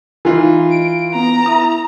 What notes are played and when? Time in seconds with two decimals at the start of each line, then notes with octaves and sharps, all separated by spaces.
0.25 E3 D#4 F4
0.70 D7
1.15 B3 A#5
1.46 E4 D#6